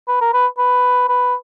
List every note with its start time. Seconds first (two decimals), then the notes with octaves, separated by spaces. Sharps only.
0.08 B4
0.21 A#4
0.33 B4
0.58 B4
1.08 B4